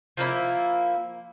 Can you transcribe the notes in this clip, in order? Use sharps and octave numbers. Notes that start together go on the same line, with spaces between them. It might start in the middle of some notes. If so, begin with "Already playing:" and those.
F3 A#3 D#4 E4